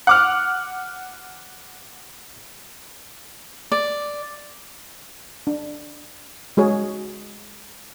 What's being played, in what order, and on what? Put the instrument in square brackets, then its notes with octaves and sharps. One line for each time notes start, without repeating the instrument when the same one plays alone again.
[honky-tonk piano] F#5 D6 F6
[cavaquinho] D5
[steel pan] D4
G#3 F#4 G#4 C#5